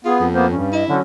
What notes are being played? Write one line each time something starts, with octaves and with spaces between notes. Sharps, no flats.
B3 F4 G#4
F2
A#3 B3 C5
G2 C#4
E4 D#5
D3 F#3 C#4